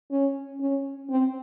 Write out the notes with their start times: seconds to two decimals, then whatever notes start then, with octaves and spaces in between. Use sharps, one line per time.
0.11 C#4
0.60 C#4
1.10 C4